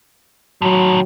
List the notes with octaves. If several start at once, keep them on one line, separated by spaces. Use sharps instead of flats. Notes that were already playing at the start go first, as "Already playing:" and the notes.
A2 D#3 F#3